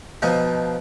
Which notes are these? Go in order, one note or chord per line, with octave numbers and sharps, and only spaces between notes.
B2 F3 D#4